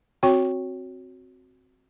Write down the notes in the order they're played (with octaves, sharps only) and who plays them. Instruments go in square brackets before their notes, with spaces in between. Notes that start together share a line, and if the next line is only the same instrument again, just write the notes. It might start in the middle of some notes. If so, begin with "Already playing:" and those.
[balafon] C4 F#4 C#5 G5 C#6